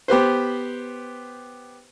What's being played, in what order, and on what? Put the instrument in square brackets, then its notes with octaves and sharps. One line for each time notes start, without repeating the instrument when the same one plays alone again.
[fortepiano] B3 G4 B4 C5